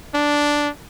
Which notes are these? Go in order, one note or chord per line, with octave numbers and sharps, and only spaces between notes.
D4